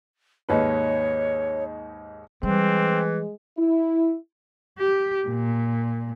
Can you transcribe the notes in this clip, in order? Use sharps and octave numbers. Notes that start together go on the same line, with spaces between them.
D#2 G#2 B4 C#5
E3 G3 G#3 C4
E4
G4
A#2